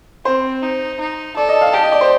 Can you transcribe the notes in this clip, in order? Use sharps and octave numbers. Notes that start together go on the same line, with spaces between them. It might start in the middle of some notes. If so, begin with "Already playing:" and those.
C4 C5
D#4
D#4
A4 D5
D#5
F5
G4 A5
D#5
D5
C5